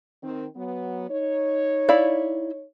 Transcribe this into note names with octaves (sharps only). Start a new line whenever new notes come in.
D#3 C4
F#3 B3
D#4 C#5
E4 D5 F5